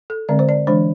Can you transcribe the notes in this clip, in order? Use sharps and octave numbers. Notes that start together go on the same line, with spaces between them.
A4
D3 G#3 C4 D5
C5
D5
E3 G#3 D4 C5